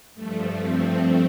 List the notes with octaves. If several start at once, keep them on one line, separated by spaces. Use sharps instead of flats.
G2 F3 A3
C4